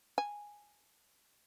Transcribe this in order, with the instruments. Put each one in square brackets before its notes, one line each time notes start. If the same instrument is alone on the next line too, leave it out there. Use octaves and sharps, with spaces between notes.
[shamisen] G#5